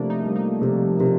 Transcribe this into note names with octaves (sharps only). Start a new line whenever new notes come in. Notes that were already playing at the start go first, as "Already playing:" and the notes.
Already playing: C3 F3 A3 A#3 D4
D#4
G3
D#4
C3
C3